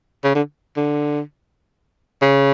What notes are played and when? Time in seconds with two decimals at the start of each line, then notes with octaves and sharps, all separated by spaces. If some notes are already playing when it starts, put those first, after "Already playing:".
0.24 C#3
0.35 D3
0.77 D3
2.22 C#3